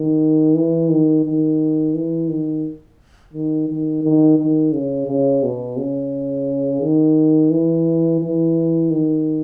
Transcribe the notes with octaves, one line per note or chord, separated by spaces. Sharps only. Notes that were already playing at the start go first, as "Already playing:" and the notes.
Already playing: D#3
E3
D#3
D#3
E3
D#3
D#3
D#3
D#3
D#3
C#3
C#3
B2
C#3
D#3
E3
E3
D#3